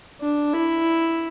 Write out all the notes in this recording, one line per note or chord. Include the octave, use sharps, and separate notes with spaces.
D4
E4